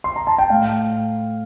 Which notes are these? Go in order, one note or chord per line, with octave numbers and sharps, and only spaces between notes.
C6
A#5
A5
G5
A2 F5